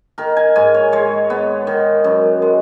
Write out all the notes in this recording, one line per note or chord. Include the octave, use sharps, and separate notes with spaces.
D#3 A#4
G#5
G#2 G#5
C#5
G#3 C#5
B3
D#3
F#2
G#3